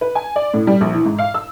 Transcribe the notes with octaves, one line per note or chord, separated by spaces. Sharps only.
B4
G#5
D5
A2
G3
A#1
E3
G#2
F5
E6